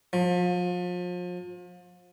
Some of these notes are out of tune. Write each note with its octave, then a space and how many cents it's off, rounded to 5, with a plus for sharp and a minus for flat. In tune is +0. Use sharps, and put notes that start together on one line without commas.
F3 +35